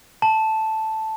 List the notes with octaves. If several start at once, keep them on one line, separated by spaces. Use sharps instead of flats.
A5